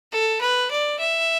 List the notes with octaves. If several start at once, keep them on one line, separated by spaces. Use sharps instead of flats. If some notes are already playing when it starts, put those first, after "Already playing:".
A4
B4
D5
E5